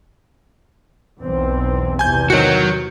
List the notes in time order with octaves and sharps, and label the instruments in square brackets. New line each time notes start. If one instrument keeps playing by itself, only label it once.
[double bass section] B1 E2 C4
[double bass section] E2 C3 [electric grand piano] G#5 G6
[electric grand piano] D#3 C#7 [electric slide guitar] F#4 C#5